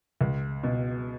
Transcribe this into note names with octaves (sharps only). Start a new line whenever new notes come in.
C#2
B2